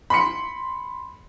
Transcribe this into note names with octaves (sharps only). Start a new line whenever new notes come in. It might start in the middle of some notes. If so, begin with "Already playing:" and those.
B5 C6 B6 C#7